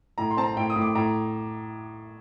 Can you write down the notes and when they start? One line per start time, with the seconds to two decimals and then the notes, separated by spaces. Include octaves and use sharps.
0.18 A2 A#5
0.31 C6
0.37 C4 A5
0.44 A#5
0.56 A2 G5
0.70 D#6
0.76 A2
0.82 D6
0.95 A2 A#5